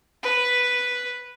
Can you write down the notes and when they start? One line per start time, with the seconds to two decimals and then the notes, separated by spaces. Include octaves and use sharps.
0.23 B4